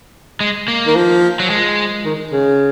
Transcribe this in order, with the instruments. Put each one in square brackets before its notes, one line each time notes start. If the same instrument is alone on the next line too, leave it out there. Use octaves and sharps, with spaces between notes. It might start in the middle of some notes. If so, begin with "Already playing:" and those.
[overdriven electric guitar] G#3
A#3
[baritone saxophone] D#3
F3
[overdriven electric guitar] F#3
G#3
[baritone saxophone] D#3
C#3